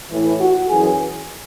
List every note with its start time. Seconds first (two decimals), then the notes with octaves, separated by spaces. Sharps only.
0.11 A2 E3
0.40 F#4
0.69 F#2 E3 G#4